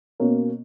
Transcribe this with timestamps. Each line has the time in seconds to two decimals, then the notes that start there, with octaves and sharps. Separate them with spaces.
0.20 B2 A#3 C#4